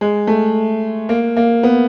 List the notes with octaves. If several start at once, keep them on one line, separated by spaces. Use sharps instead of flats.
G#3
A3
A#3
A#3
B3